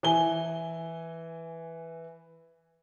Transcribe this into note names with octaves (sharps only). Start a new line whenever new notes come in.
E3 G#5 G7